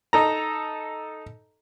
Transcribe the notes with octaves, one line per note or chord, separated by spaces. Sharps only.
D#4 A4 A#5